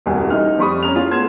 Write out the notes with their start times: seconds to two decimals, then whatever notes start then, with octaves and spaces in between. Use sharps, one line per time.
0.06 D#1 C2 F#4 G#5
0.30 A1 D#4 F6
0.58 F2 G3 B5 C#6 D#6
0.83 C#4 A#5 F6 F7
0.95 C#4 F4 G#4
1.11 A3 B3 C6 G#6 E7